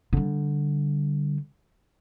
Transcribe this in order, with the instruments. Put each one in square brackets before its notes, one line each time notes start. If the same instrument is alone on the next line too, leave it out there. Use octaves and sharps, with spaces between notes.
[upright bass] D3 G3